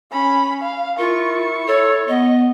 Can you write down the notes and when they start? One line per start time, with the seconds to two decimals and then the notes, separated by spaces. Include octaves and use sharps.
0.11 C#4 B5
0.62 F5
0.99 E4 F4 A#4 C#6
1.68 A4 C#5
2.08 B3 D#5